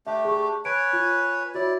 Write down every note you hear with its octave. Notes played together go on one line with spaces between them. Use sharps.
A3 D4 G4 E5
G#4 C#6
B4 C#5 G#5 D7
F4
E4 F#4 C#5 D5